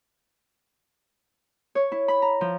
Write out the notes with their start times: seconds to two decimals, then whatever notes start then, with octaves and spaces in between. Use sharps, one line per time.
1.75 C#5
1.92 E4
2.08 B5
2.22 A#5
2.41 F3